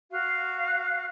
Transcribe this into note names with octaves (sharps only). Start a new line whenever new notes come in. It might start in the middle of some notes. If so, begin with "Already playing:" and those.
F#4 F5